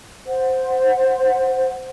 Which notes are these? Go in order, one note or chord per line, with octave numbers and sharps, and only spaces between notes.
C5 F#5